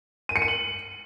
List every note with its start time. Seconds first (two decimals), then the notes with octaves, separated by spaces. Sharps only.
0.29 D#7
0.36 C#7
0.42 D#7
0.48 F#7